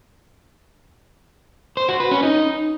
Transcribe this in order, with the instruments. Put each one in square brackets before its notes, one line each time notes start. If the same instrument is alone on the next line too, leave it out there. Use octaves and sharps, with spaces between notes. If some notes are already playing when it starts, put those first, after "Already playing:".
[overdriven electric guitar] C5
F#4
B4
C#4
D#4